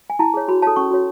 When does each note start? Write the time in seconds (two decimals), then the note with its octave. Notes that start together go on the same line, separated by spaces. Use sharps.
0.10 G#5
0.19 E4 A5
0.34 G#4 C#5
0.48 F#4 B5
0.62 A4 C#5 A5
0.76 C#4 C#6
0.91 F#4 C#5